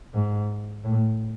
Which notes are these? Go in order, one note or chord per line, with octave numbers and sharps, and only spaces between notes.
G#2
A2